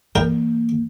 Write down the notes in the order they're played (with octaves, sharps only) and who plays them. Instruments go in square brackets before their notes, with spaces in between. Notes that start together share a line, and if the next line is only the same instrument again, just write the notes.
[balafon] E3 [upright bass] A#3 [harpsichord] A#4 G5